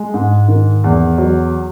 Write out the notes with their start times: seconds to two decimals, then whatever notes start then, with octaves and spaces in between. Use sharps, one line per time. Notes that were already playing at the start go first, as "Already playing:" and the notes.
Already playing: G#3
0.14 G#2
0.48 D#3
0.84 E2
1.18 F#3